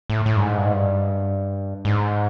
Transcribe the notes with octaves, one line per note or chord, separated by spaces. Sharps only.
A2
A2
G2
G#2
G2
G#2
G2
G#2